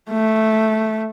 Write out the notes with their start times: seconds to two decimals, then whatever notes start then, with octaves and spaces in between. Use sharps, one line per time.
0.10 A3